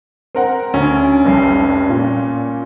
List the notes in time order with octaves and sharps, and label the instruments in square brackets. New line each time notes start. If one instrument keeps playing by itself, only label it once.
[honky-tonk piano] C4 A#4 F#5
[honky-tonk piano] D2 [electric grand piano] C#4
[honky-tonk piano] F1 C2 C7
A#2